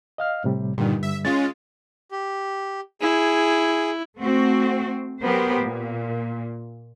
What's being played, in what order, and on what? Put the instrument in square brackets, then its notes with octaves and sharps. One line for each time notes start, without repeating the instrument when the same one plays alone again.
[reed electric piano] D#5 F5 F6
A2 C3 G3
[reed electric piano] G2 D3 G3 [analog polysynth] A#2 D#3
[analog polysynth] E5
[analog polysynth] G#3 C#4 F4 [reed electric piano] A6
[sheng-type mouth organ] G4
[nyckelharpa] E4 [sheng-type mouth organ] G#4
[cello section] A3 C4 F#4
F#3 B3 G4 A#4 C5
A#2